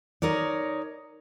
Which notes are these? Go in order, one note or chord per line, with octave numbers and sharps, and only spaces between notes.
D#4 A#4 C#5 D5